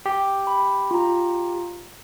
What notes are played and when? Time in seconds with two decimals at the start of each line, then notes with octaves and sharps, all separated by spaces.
0.06 G4
0.47 B5
0.91 F4 A#5